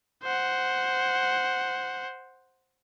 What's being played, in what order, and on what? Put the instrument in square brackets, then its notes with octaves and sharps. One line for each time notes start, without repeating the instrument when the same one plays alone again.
[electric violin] C5 F#5